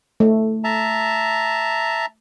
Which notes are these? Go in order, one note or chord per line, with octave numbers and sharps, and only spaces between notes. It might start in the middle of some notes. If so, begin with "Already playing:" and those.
A3
E5 A5 A#5